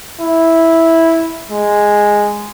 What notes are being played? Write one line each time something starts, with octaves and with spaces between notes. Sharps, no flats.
E4
G#3